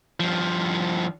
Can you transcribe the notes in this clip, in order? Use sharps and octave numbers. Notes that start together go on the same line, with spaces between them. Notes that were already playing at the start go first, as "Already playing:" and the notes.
G2 F3